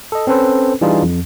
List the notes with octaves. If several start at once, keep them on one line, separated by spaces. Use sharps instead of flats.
A4 D#5
C4 C#4 A4 B4 C5
E3 G3 D4 D#4 F4 G#4
F2